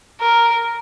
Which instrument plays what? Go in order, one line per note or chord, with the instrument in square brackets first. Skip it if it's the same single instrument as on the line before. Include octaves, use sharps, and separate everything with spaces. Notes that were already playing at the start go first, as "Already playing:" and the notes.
[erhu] A#4